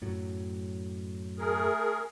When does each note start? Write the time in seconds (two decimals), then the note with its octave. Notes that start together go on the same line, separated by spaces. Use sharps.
0.02 F#2 A2 F#3
1.39 A3 G#4 A#4